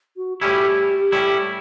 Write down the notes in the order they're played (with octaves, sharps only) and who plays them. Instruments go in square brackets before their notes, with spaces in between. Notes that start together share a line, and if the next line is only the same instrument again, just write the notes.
[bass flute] F#4
[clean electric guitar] A2 G3 C#4 E4 [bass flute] G4
[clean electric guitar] A2 G3 C#4 E4